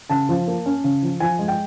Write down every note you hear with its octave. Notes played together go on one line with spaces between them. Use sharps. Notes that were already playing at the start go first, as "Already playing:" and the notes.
C#3 A5
F3
A#3
C#4
C#3
F3
F3 G#5
G#3
G5